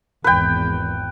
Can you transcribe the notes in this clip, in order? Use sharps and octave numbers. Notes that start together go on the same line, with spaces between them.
G#1 E2 B4 G5